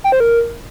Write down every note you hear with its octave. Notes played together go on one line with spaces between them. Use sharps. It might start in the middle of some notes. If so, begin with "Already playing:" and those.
G5
C5
A#4